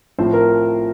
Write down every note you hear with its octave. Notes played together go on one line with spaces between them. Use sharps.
A2 F3 C4 C5
A#4